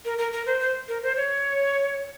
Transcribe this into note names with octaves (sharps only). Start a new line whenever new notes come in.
A#4
A#4
A#4
C5
C5
A#4
C5
C#5